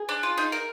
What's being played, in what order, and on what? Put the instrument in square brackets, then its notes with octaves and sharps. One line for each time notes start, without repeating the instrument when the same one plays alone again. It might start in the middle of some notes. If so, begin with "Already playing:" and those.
Already playing: [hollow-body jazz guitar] G#4
[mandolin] D4
F4
D#4
A#4